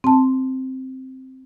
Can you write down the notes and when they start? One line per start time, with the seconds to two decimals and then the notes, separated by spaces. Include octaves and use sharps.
0.04 C4 A5